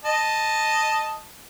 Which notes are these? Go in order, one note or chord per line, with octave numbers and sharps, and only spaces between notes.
D#5 A5